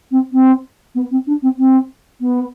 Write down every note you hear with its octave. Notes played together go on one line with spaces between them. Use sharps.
C4
C4
B3
C4
D4
C4
C4
B3